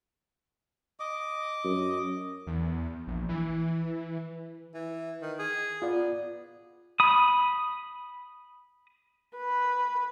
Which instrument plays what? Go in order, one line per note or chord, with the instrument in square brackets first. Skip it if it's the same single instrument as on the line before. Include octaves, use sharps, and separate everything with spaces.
[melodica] D#5 D6
[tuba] F#2
[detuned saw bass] E2
A#1
E3
[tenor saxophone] E3
D#3
G#4
[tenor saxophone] B3 [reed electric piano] F4 D5
[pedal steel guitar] B5 D#6
[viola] B4